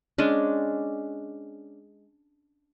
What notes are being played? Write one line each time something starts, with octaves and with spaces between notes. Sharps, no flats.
G#3 C#4 D4